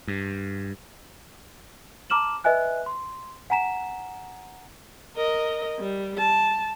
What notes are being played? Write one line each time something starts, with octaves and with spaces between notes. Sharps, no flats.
G2
A5 A#5 D6 F6 E7 F#7
B4 D#5 E5 G#5 F#6
C6
F#5 G#5 A#5 B6 E7
A#4 D#5
G3
A5